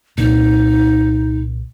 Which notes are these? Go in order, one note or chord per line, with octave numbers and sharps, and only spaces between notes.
C2 A#2 D#4